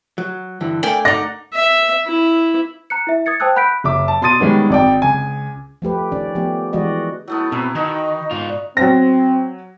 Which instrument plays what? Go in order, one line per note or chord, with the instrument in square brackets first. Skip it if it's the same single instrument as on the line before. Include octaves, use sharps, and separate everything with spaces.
[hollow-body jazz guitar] F#3
G2 D3 E3
[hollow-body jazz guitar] A3 D4 A#4 [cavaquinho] D5 G5 G#5
[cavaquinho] D#4 F#5 [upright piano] D5 A#6
[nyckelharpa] E5
E4
[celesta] A#5 F#6 C#7
E4 E5
D#6 G#6 A6 C#7
C5 G5 A5 D#6 E6 F#6
F#5 B5 F#6 G6 B6 D7
[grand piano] F#1 E5 D6
A5
B2 C6 D#6 A6 D#7
D#3 G3 G#3 B3 C#4
G#1 D5 G5
C#2 G#5
[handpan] F3 A3 G4 B4
D#3 C#4 D5
F3 A3 B3 G4
E3 G#3 F#4 D5 D#5
[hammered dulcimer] F#3 A3 B3 [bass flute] E4
[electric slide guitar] B2 [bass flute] C4 [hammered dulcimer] E4 B4 A#5
[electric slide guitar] D#3 [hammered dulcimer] D#4 F#4 B5 [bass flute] D#5
[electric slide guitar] G#2 F4
[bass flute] D5
[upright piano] F#3 A#6 [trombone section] C4